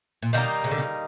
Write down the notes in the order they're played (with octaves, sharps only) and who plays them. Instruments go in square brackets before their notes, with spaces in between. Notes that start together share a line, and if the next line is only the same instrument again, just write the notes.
[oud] A#2
[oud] B2 [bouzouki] D#3 G3 A#3 D#4
[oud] C#3
D3
C#3